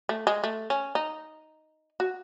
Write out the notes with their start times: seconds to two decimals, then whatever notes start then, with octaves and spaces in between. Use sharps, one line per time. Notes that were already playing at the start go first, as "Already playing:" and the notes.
0.09 A3
0.27 G#3
0.44 A3
0.70 C#4
0.95 D#4
2.00 F#4